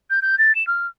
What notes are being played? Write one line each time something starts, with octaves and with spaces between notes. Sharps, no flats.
G6
G6
A6
E7
F6